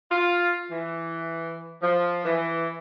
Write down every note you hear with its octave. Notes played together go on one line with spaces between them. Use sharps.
F4
E3
F3
E3